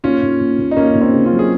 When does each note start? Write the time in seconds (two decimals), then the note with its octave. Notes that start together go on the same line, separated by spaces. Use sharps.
0.04 D#2 C#4 F4
0.23 D#2
0.40 D#2
0.59 D#2
0.71 D#4
0.77 D#2 A#3 C#4
0.95 D#2
1.01 C4 D#4
1.13 C#3
1.25 C#4 F4
1.32 F#3
1.39 G#4